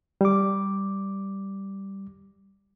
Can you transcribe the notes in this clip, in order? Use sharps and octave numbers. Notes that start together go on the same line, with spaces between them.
G3 D6